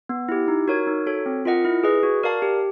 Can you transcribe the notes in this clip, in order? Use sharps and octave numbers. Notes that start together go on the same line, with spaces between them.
B3
E4 G4
D#4
F#4 A#4 C#5
D#4
F#4 A4 C#5
C4
F4 A#4 D#5 F#5
E4
G#4 B4 D#5
F#4
A#4 D5 F5 A5
G4